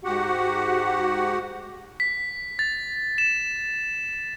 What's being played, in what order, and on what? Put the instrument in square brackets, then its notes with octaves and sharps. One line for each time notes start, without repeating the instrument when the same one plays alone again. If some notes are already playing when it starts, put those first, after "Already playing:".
[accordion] G#2 F#4 G4 F#5
[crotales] B6
A6
E7